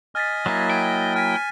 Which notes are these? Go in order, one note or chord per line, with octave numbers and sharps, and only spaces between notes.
D#5 G#5 F6 A6 B6
F#3 A#3 E4
G5
G#5 F6 B6